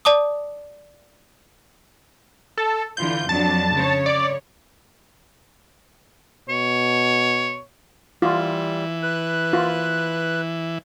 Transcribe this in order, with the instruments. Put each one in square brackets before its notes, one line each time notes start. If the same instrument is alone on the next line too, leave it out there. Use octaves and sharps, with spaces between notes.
[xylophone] D5 A5 D6 D#6
[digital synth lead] A4
[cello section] D3 E3 F4 [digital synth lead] G6
[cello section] F2 F#3 D4 [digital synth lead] A5
[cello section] C#3 C#5
[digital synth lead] D5
[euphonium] B2 [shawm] C#5
[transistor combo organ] E3 [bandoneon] G3 [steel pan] F4
[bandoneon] B4 F#6
[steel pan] F4